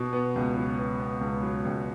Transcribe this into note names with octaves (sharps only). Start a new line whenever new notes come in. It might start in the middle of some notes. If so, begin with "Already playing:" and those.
Already playing: B2
B3
C#2
F#3
B3
B3
C#2
F#3
C#2